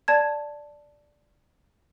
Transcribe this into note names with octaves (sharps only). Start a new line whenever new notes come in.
D5 A5 G#6